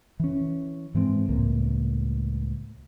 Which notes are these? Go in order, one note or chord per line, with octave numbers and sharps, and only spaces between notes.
E3 C#4
G#2 E3 G#3 C4
C#2 A2 A#3